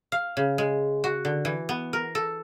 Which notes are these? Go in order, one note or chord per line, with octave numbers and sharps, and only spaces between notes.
F5
C#3
G#3
F#4
D3
E3
B3
A#4
A4